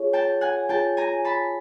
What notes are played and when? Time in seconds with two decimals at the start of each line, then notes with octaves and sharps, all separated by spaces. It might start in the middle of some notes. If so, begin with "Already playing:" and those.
Already playing: F4 G#4 C#5
0.13 G5 A5
0.41 F#5 G#5
0.69 F4 G#4 C#5 G5 A5
0.97 G#5 A#5
1.25 A5 B5